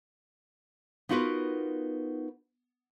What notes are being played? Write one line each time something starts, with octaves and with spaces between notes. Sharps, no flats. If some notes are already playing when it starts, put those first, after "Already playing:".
B3 D#4 F4 F#4 A#4 B4